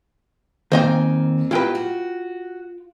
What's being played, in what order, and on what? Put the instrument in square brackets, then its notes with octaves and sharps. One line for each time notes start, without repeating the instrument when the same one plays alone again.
[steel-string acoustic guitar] F2 C4 G#5 [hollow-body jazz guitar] D#3 A#3 [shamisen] C5 D#5 G5
[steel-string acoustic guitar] B2 F#3 G4 [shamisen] E4 B4 [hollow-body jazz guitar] F4 G5
[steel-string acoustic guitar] F#4